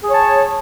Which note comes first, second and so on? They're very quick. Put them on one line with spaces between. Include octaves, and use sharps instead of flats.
G#4 C#5 A5